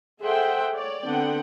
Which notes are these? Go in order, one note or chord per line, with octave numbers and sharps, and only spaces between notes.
G#4 A4 C5 E5 F#5 G5
C#5 D5
D3 B3 C4 F#5 G5